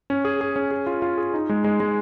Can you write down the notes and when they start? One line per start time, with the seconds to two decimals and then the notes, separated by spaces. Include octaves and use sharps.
0.10 C#4
0.25 G#4
0.41 G#4
0.56 C#4
0.71 G#4
0.87 F4
1.02 F4
1.18 G#4
1.34 D#4
1.49 G#3
1.64 G#3
1.80 G#3